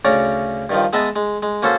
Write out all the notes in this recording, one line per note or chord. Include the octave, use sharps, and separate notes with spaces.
D2 C#3 C#4 C#5 D5 A#5
G2 D#3 F3
G#3 B3 B4 D#5 E5 A5
G#3
G#3
A#3 C#4 F#4 A4 C5